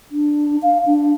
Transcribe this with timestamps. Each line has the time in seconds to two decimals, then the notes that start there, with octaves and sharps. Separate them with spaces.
0.11 D4
0.63 F5
0.86 D4